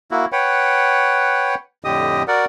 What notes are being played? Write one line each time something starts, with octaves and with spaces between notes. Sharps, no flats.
A#3 E4 F#4
B4 C#5 F#5 G5
F2 A2 D3 G4 D#5 D#6
F#4 A#4 D5 F#5